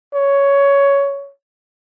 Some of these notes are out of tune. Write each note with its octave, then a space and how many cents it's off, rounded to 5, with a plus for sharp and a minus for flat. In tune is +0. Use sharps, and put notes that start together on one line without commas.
C#5 +10